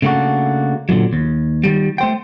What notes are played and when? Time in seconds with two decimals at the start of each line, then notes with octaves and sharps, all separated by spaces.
0.02 C#3 A3 A#3 D4 F#4
0.89 A#2 D3 D#3 F#3
1.13 D#2
1.64 D#3 G3
1.98 A3 C5 G5